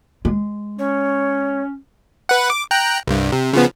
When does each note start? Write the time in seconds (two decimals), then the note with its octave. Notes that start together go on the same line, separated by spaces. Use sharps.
0.25 G#3
0.79 C#4 C#5
2.29 B4 F#5
2.50 D6
2.71 G5 A#5 F#6
3.07 C2 G2
3.32 C3
3.53 C#3 F3 B3